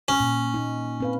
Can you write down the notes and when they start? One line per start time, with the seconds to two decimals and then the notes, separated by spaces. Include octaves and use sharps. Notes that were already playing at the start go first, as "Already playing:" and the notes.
0.08 C#4
0.20 A#2
0.54 A#3 D#4
1.00 C4 B4 F5